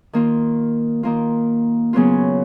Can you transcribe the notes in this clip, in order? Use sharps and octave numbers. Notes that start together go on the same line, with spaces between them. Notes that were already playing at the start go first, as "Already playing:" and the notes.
D#3 A#3 F4
D#3 A#3 F4
C#3 F#3 B3 F4